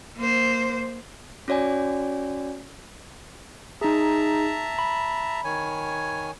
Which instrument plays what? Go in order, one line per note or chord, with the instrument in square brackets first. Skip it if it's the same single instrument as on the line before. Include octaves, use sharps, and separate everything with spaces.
[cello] A#3 C5
[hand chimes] C#4 F#4 C#5 D5 G#5
[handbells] D#4 G#4 [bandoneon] E5 A5 A#5
[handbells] B5
[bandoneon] D#3 C#5 G#5